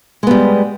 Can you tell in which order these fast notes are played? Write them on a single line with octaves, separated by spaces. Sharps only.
G#3 B3 G3